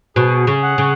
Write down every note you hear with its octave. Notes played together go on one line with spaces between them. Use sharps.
B2 G#4
C#3
F#5
C#3